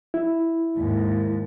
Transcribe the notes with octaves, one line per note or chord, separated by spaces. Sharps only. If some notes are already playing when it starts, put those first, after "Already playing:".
E4
D#2 G#2